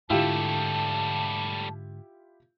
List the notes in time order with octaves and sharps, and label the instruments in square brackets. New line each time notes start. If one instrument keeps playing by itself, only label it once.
[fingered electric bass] G#2 D3 [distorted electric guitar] G3 A3 [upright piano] E4 F4 G4 [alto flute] A5